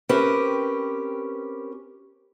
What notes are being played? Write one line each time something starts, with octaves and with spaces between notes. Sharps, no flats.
C4 C#4 G4 A#4 B4